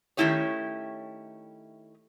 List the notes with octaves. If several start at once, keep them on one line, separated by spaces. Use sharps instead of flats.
D#3 A3 C#4 E4 G4 C#5